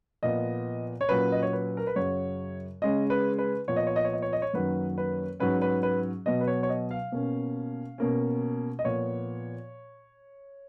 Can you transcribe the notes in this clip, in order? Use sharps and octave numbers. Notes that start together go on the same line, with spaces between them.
A#2 F3 B3 D#5
C#5
A#2 F#3 C#4 B4
D#5
C#5
B4
A#4
B4
F#2 C#3 F#3 C#5
C#3 G#3 C#4 D#5
B4
B4
A#2 F3 B3 C#5
D#5
C#5
D#5
C#5
D#5
C#5
D#5
C#5
F#2 D#3 F#3 A#3 C#4 B4
B4
G#2 F#3 C#4 B4
B4
B4
B2 F#3 B3 D#5
B4
C#5
C#5
D#5
F5
B2 A#3 C#4
B2 A#3 C#4
D#5
A#2 F3 B3 C#5